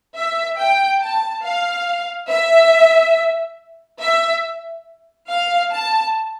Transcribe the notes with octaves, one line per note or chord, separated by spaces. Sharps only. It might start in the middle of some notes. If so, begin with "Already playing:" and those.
E5
G5
A5
F5
E5
E5
F5
A5